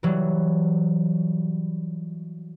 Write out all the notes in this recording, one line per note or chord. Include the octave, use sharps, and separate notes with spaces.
E3 F#3 G3